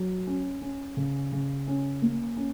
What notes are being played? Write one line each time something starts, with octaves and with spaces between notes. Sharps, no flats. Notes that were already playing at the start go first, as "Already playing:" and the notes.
Already playing: F#3
C#4
C#4
C#3
C#3
C#4
A#3
C#4